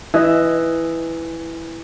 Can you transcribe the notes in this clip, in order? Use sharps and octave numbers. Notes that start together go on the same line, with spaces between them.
E3 D#5 E5